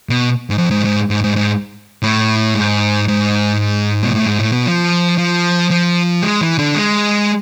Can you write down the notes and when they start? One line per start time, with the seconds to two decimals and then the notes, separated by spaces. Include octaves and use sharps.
0.09 B2
0.50 G#2
0.58 F2
0.71 G#2
0.85 G#2
1.10 G#2
1.24 G#2
1.36 G#2
2.03 A2
2.55 G#2
3.08 G#2
4.04 B2
4.12 A2
4.26 G#2
4.39 A2
4.52 B2
4.66 F3
5.18 F3
5.70 F3
6.23 G#3
6.41 E3
6.59 D3
6.75 G#3